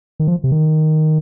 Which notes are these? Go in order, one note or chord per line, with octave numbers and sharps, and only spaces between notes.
D#3
F3
C3
D#3